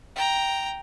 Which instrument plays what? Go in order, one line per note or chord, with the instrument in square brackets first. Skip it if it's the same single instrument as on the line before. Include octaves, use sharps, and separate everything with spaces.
[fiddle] G5 A#5